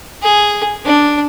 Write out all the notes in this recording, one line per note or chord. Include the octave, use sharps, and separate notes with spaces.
G#4
D4